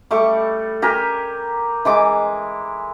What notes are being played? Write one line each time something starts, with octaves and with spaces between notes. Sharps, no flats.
G3 A3 C#6 D6
G4 A#4 G#5
E3 G#3 D6